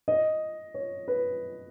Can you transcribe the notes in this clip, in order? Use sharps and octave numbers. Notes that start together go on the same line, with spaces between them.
D#5
C#5
B4